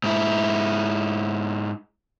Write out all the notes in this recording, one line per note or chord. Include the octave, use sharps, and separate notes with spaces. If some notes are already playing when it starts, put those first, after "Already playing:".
G#2 E4